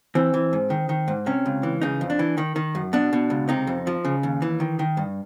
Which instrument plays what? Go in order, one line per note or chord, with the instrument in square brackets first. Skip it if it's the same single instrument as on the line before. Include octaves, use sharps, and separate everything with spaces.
[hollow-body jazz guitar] E3 C4
E3
G#2
D#3
D#3
G#2
C3 C#4
C#2
E3
C#3 D#4
F2
D4
E3
D#3
D#3
F#2
B2 D4
B2
C#2
C3 D#4
F2
F3
C#3
D#2
E3
D#3
D#3
G2